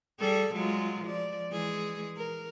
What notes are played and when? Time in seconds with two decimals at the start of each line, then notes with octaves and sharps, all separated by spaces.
0.20 G3 G#4 A4
0.54 F#3 G#3 F4
1.04 F3 D5
1.51 E3 G#3 G#4
2.17 A#4